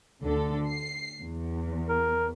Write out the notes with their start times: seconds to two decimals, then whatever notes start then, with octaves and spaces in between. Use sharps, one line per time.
0.23 D2 D3 A4
0.69 C7
1.23 E2
1.89 A#4